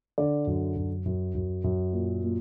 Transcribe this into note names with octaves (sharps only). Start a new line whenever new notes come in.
D3 D5
F#2
F#2
F#2
F#2
F#2
A#2
A#2